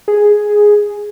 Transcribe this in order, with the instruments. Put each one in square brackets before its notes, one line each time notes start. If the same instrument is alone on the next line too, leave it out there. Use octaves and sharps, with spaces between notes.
[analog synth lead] G#4